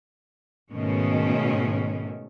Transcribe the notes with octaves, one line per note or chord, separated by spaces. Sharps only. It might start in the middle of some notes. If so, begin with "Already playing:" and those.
G#2 B2 D#3 A3 C#4